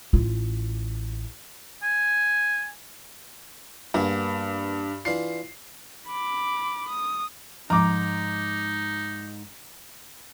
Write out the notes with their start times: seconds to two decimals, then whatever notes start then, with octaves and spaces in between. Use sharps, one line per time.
0.13 A1 F4
1.82 G#5
3.94 G2 A#3 B3 G#4
5.05 E3 D4 F4 C7
6.07 B5 D6
6.88 D#6
7.70 G#2 F3 D#4 A#5 D6